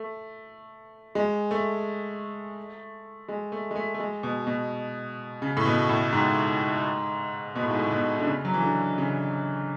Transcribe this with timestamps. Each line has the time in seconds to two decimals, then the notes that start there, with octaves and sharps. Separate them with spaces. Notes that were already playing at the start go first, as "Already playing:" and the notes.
Already playing: A3
1.15 G#3
1.51 A3
3.28 G#3
3.52 A3
3.71 G#3
3.76 A3
3.94 A3
4.00 G#3
4.23 B2
4.47 B2
5.42 C#3
5.57 A2
5.65 B2
5.89 A2
6.13 G#2
7.55 B2
7.63 A2
7.70 G#2
7.79 A2
7.91 B2
8.19 D3
8.26 C#3
8.45 F#3
8.54 E3
8.62 D3
8.98 C#3